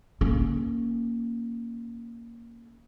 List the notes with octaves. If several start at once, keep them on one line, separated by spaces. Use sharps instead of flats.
A#3 C#4